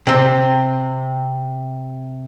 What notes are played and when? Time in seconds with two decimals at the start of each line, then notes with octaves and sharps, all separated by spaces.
0.07 C3 C4